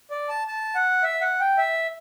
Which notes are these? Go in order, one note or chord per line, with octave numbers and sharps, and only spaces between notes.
D5
A5
A5
F#5
E5
F#5
G5
E5